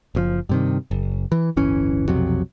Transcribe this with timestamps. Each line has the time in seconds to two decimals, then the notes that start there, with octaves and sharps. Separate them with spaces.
0.15 F#1 B2 F3
0.49 G2 C3 D#3
0.91 F#1
1.32 E3
1.57 D1 G1 E3 C#4
2.08 B1 F2 C3 F#3